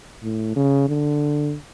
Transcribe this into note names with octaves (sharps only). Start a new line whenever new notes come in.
A2
C#3
D3